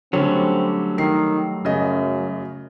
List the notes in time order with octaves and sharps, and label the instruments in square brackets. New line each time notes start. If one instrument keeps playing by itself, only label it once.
[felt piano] D3 C#4 [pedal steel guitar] F#3 G3 A3 [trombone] C4
[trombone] D#3 [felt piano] C7
[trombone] F#2 [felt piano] C#3 D#5